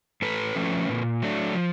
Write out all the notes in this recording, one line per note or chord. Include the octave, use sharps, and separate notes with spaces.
A2 A4 B4
F3 A3 C#4
A#2
F#3 A3 D4
F3